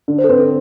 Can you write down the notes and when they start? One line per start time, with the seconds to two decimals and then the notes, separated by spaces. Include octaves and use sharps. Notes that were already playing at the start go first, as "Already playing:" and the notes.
0.08 D3
0.18 C5
0.24 A4
0.29 C4 B4
0.40 A4